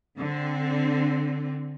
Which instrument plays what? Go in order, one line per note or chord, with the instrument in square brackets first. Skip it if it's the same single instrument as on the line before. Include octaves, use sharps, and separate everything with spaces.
[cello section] D3 C4